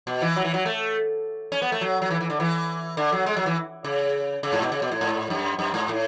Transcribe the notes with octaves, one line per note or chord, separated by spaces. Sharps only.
B2
E3
F#3
E3
F#3
A3
C#4
B3
A3
F#3
F#3
E3
E3
D3
E3
D3
F#3
G#3
F#3
E3
C#3
C#3
G#2
B2
C#3
B2
A2
G#2
F#2
F#2
G#2
A2